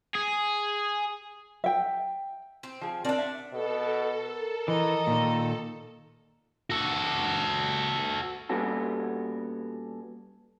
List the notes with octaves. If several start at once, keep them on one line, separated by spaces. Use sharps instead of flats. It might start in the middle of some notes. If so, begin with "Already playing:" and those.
G#4
E5 G5
C4
F3 G#4
C4 D4 A#4 D5 A5
E5 F#5
B2 A4
A#4
E3 D#5 A#5
A#2 D#3
F#4 A4
A#2 G3 B3 C#4 F#4 A4